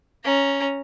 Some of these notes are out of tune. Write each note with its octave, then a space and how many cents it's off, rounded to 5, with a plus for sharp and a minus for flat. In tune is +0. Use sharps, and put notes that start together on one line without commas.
C#4 +0 A#5 +0